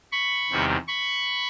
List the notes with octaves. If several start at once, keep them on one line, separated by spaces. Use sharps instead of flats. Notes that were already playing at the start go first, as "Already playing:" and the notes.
B5 C#6
E2 C3 D#3 G3
B5 C#6